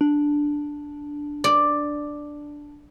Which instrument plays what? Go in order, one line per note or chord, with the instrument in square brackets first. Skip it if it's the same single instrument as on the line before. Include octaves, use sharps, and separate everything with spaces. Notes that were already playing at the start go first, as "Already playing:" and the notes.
[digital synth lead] D4
[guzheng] D5